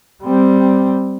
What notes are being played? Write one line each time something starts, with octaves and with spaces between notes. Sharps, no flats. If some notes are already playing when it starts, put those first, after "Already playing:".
G3 C4